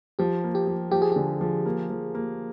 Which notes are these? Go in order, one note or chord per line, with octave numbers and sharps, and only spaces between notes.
F3 G4
A#3
G4
F3
F3 G4
G#4
D3 G4
F3
A#3
F3
A#3